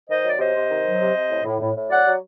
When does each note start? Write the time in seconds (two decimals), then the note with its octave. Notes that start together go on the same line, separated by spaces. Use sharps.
0.09 D#3 C5 D#5
0.24 F#3 D5
0.39 C3 C5 D#5
0.55 C3
0.69 D#3
0.85 F#3
1.00 C3
1.15 C3
1.30 A2
1.44 A2
1.60 A2
1.75 A2
1.90 F#3 D5 F#5
2.05 F#3